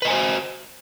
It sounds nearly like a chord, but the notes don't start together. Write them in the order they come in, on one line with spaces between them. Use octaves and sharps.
B4 D#5 G#5 C5 F#4